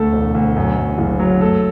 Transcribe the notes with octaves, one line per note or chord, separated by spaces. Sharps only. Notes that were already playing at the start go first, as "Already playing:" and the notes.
Already playing: D2 A3 A4
E1
D2
F#2
F#2
F#1
F#3
A3 A4